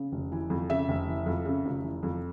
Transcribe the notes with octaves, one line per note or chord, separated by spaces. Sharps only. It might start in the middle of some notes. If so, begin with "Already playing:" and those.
Already playing: C#3
F1
E3
F2
C#3 E5
F1
E3
F2
C#3
F1
E3
F2